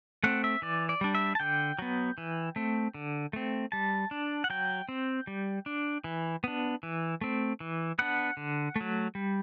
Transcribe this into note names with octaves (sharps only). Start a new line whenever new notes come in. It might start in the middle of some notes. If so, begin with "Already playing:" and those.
A3 C4 F#5
E5
E3 D5
D5
G3 D4
E5
A5
D3 G5
F#3 B3
E3
A3 C4
D3
A3 C4
G3 A5
D4
F#5
F#3 G5
C4
G3
D4
E3
B3 D4
E3
A3 C4
E3
B3 D4 F#5
D3
F#3 A3
G3